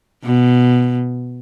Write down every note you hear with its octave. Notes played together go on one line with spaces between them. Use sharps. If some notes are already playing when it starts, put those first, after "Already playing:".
B2